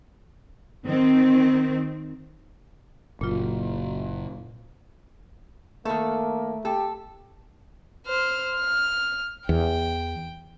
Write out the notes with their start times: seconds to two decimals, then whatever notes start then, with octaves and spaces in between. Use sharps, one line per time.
0.86 D#3 C4
3.21 F#1 A#2 F4
5.85 D#3 A3 A#3 A4
6.65 G4 A4
8.07 C5 F6
8.56 F6
9.49 E2 G5